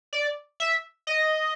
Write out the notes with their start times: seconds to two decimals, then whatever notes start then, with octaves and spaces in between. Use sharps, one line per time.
0.13 D5
0.60 E5
1.07 D#5